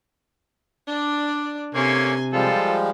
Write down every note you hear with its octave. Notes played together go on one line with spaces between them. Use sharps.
D4 D5
C3 A3 A#3 C#4 G#5 C6
F3 G3 G#3 F4 A4 C5